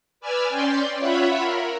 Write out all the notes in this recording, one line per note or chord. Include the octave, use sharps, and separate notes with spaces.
B4 D5 G#5 E6 F6
C#4 D5 G5 C6
F4 C#5 E5 F#5 B5
A#4